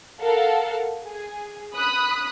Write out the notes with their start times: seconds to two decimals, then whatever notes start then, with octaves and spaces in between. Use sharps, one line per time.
0.21 A4 A#4 F5 F#5
1.04 G#4
1.75 B5 D#6 F#6